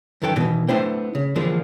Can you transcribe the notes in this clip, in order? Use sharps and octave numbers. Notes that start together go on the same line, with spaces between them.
F#2 D#3 E3 A4 A#4 G5
B2 D#3 E3
A3 B3 D4 E4 C5 G5
C#3
D3 E3 F3 G#3 A#3 D4